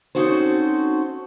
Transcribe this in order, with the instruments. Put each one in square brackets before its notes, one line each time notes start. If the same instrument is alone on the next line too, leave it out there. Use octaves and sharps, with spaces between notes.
[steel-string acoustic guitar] C4 C#4 D#4 F#4 A4 C5